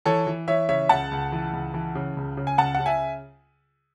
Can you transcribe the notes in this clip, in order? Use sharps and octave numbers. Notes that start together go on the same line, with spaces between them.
E3 A4 C#5
E3
E3 C#5 E5
C#3 C#5 E5
C#2 F#5 A5
C#2
E3
C#2
E3
C#3
C#2
C#3
G#5
C#2 F#5 A5
C#3 F#5
E5 G#5